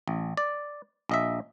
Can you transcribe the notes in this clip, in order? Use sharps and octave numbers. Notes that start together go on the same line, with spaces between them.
A1
D5
A#1 D#5 E5